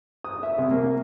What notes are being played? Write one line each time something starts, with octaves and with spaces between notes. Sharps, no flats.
D#6
E5
C2
A#3